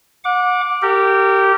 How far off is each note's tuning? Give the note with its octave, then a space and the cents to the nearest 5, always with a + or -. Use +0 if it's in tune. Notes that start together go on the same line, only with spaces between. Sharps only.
F#5 -35 D6 +0
G4 -15 A#4 -30